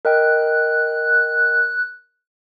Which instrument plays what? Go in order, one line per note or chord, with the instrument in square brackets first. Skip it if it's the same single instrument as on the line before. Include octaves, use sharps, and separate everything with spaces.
[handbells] A#4 D#5 G5 [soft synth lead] F#6